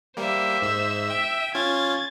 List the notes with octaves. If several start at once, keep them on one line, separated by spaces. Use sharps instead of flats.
G3 A#3 C5 E5
G#2 E6
E5 G5
C#4 F4 G#6 A6